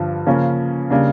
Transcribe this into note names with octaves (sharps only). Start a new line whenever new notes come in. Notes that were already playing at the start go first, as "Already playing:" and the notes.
Already playing: G2 D3 F3
C#3 F3 A#3 C#4
C#3 G3 A#3 D4